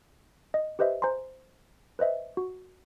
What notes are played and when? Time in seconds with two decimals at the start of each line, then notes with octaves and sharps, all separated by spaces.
0.54 D#5
0.79 G4 B4 C5 D#5 E5
1.02 C5 G#5 A#5 C6
1.99 B4 C5 D#5 E5
2.37 F#4